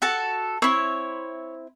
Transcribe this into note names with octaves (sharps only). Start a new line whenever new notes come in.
F#4 A4 A5
C4 E4 C#5